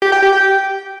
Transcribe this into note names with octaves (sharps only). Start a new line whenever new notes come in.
G4
G5
G4
G5